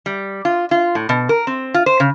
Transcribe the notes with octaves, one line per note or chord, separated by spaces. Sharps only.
G3
F4
F4
A2
B2
A#4
C4
F4
C5
C#3